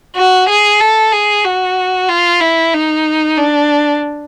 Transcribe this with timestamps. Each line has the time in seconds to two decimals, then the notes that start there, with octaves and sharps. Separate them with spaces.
0.16 F#4
0.49 G#4
0.80 A4
1.12 G#4
1.45 F#4
2.09 F4
2.40 E4
2.73 D#4
3.37 D4